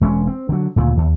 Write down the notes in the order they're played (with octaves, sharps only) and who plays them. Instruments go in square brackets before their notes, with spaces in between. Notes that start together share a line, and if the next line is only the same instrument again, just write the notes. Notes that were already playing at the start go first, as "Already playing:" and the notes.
[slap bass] E1 G#3 A#3 C#4
C4
D3 F#3
D2 A#2 C#3
D#2